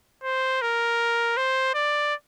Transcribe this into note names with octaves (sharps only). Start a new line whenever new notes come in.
C5
A#4
C5
D5